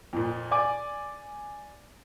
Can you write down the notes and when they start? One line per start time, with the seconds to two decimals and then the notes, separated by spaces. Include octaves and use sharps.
0.13 F2 A#2
0.51 D5 G#5 D6